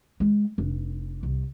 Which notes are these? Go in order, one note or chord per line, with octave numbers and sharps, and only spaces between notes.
G#3
F1 D4
C2